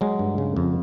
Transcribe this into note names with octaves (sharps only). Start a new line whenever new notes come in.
F#3 G#3
G2
C#3
F2